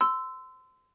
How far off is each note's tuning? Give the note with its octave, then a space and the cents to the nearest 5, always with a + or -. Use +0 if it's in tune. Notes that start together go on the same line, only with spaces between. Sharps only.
C6 -25 E6 +0